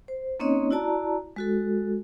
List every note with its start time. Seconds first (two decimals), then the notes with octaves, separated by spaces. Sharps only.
0.08 C5
0.40 A#3 C4 C#4 D#4 C#5 D#5
0.71 E4 F#4 D5 A5 A#5
1.36 G#3 F#4 A4